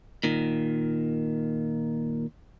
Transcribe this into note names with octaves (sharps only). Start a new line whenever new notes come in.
A#2 D#3